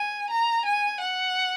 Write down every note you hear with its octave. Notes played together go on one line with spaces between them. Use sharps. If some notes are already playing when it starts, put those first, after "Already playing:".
Already playing: G#5
A#5
G#5
F#5